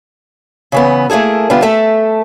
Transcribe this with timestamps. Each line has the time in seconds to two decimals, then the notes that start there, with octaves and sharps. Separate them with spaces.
0.72 C#3 E3 B3
1.10 A3 A#3 E4 G#4 A4
1.50 D3 G3 B3 F4
1.62 A3 A4 E5